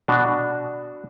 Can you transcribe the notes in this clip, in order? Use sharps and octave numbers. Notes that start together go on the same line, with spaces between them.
B2 D4 F#4